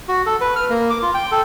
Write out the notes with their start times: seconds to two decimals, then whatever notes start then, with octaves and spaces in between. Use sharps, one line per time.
0.08 F#4
0.26 A4
0.41 B4
0.56 F6
0.70 A#3
0.90 D6
1.02 F4
1.14 G5
1.31 A4